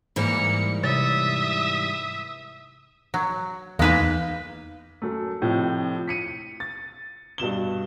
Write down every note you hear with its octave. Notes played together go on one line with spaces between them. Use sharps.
G#2 E3 G3 A#3 C#7
C3 C#5 E5 D#6 A6
F#3
E2 G#3 A#3 D#4 A#4 B4
F#2 A3
F2 A2 C3 F3
B6 C#7 D#7
A6
G2 B2 E7 G7